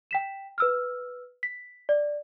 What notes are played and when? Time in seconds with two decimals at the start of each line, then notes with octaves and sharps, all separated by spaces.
0.11 G5 B6 E7
0.58 B4 E6 F6
1.43 B6
1.89 D5